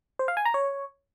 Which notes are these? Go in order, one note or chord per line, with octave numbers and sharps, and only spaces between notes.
C5
F5
G#5
A#5
C#5